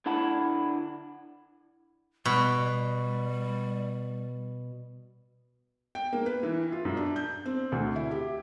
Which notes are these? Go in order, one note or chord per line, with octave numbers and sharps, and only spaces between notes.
D3 E4 F#5 A5 B5
B2 G3
G5
A#3
B4
E3
F4
F#2
D4
G6
C4
D2
E4
G4